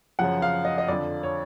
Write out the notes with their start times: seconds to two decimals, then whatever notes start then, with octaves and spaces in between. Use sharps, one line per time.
0.19 F#2 C#3 F3 F#5
0.42 F5
0.65 D#5
0.78 D#5
0.88 F2 D3 F3 D5
1.23 C#5